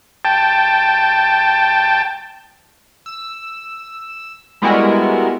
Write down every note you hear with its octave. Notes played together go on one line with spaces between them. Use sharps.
G5 A5
E6
G3 G#3 B3 E4 F#4 A#4